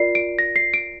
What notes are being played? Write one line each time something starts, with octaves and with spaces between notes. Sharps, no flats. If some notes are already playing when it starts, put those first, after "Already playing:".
Already playing: F4 A#4 D5 C7
D7
A#6
C7
D7